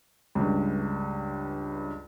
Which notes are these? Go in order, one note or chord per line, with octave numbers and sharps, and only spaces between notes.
C#2 G2